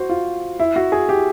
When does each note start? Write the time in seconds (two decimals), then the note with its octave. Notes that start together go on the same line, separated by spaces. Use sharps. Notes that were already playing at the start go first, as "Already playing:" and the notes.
Already playing: F#4 C5
0.09 F4
0.60 E4
0.76 F#4
0.92 G#4
1.09 G4